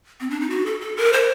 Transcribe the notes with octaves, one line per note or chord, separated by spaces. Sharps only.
C4
D4
D#4
F#4
A4
A4
A#4
C5